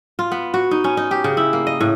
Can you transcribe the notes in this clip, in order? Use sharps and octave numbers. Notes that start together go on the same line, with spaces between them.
F4
B3
F#4
D#4
C#4
D#4
G4
C#3
E4
A#3
D#5
A2